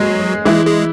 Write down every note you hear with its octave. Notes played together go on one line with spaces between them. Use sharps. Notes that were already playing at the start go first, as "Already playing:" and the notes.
Already playing: F#3 G#3 G#4
E3 G#3 E4
G#3